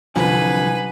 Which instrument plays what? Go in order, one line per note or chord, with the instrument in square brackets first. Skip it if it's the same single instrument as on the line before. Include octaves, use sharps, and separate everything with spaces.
[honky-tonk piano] C2 [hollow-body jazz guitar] F#2 D3 F3 [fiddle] B4 [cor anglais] G#5